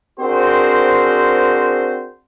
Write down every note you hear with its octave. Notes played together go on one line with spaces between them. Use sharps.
C4 D4 F#4 G#4 A#4 C5